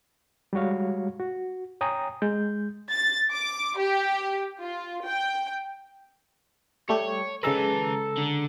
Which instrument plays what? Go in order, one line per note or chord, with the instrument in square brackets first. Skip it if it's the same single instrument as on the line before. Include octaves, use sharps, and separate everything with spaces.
[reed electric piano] G3 G#3 F#4 C#5 F5
F#4
C#5 G5 G#5 A#5 D#6
G#3 G6
[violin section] A6
D6
G4
F4
G5
[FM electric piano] G3 A3 G4 [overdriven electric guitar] C#5
[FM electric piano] C#3 G#3 A#5 [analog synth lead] A4 [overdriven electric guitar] B4 G#5
[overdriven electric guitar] D3